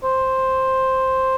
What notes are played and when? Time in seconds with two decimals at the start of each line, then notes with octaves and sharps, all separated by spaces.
0.03 C5